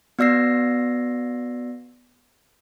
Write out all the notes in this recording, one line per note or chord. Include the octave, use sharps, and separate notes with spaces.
B3 F#4 D5 E6 A#6 C7